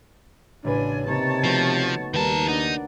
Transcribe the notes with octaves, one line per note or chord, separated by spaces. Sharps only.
A1 C#3 D4 B4 G#5
C3 A#3 D#4 C#5 A5
F3 A3 B3 F#4
D#2 D#3 G3 A#4 B4 A5
D4 D#4 F#5